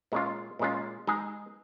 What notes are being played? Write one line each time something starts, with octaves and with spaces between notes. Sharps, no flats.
A#2 G#3 C#4 F4
A#2 G#3 C#4 F4
G#3 D#4 G#4